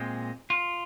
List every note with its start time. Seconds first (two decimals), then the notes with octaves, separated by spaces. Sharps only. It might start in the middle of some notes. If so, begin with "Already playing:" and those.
Already playing: A#2 G#3 C4
0.50 F4